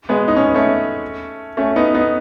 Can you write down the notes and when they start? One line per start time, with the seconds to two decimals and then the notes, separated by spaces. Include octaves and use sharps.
0.09 G#3 B3
0.28 D#4
0.36 C#4
0.46 B3
0.55 A3 C#4
1.57 A3 C#4
1.76 B3 D#4
1.94 B3 D#4